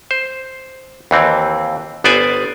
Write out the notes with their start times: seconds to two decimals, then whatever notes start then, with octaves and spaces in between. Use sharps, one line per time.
0.11 C5
1.11 D#2 E3 C4
2.04 G1 B3 C5 D5 G#5